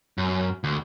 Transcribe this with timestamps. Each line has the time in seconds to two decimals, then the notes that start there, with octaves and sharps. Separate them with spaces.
0.18 F#2
0.64 D2